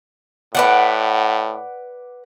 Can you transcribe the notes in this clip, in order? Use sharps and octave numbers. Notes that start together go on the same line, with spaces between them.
A2 B4 D5 F#5